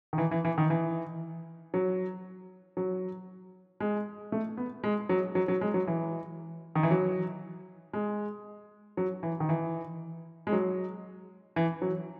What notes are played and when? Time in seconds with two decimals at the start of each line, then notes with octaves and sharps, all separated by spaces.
0.13 D#3
0.18 E3
0.31 E3
0.45 E3
0.58 D#3
0.70 E3
1.74 F#3
2.77 F#3
3.80 G#3
4.32 A3
4.57 B3
4.84 G#3
5.09 F#3
5.35 F#3
5.48 F#3
5.61 G#3
5.74 F#3
5.87 E3
6.76 D#3
6.83 E3
6.91 F#3
7.93 G#3
8.97 F#3
9.23 E3
9.40 D#3
9.49 E3
10.47 G#3
10.52 F#3
11.56 E3
11.82 F#3